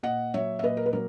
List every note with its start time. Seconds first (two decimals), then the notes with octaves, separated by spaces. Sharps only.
0.03 A#2 D#5 F#5
0.34 F#3 C#5 E5
0.59 E5
0.63 A#2 B4 D#5
0.77 A#4
0.86 B4
0.93 F#3 A#4